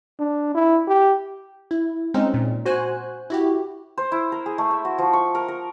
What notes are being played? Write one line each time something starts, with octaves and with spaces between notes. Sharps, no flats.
D4
E4
G4
E4
G#3 C4 C#4 D#4
A#2
F#4 C5 G#5 F#6
E4 F#4 G4
C5
E4
A#4
G#4
A3
E5
F#4
F3
C#6
A#4
A#4